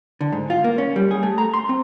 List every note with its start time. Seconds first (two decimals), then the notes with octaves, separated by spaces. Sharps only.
0.21 D3
0.32 G#2
0.50 F4
0.64 A#3
0.78 C#4
0.96 G3
1.11 G#4
1.23 A3
1.38 A#5
1.54 C6
1.69 C4